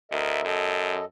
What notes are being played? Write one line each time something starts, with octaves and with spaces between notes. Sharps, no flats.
D2 A#4 D#5 E5
F#2 A4 D#5